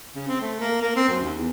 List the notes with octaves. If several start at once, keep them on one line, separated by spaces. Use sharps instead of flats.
C#3
C4
A3
A#3
A#3
C4
F#2
D#2
E2